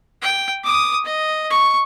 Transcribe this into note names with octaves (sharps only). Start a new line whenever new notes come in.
G5
D6 D#6
D#5
C#6